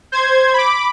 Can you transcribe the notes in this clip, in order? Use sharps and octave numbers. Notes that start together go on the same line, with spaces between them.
C5 G#6
B5 D6